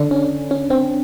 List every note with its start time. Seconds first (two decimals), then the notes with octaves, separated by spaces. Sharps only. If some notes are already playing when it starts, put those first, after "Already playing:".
Already playing: D3 D4
0.11 C#4
0.51 C#4
0.70 C4